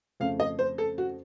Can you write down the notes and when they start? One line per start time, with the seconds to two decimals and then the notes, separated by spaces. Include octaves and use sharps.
0.20 F2 C#3 A3 F5
0.40 D#5
0.59 C5
0.78 A4
0.98 F#4